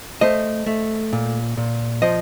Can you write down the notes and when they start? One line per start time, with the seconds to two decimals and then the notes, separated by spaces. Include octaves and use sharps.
0.21 A3 C5 D#5
0.66 A3
1.13 A#2
1.57 A#2
2.02 F3 C5 D#5